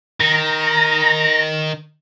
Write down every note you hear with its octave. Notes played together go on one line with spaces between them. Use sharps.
D#3 A#5